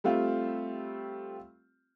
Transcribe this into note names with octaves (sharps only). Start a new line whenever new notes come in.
G3 A3 C4 F4